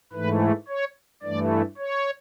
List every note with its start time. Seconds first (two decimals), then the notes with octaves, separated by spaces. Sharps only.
0.13 G#2 E3 A3 B4
0.68 C#5
1.23 G2 E3 A3 D5
1.78 C#5